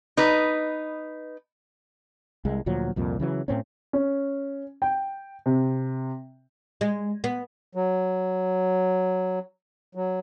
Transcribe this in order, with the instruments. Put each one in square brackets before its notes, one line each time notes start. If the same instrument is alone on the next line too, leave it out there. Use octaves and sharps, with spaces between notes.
[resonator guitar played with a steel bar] D#4 B4
[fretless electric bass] C2 G#3
D2 A#2 F3 F#3
C2 F2 A#2
C#3 E3 F#3
A2 C4 C#4
[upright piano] C#4
G5
C3
[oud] G#3
B3
[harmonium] F#3
F#3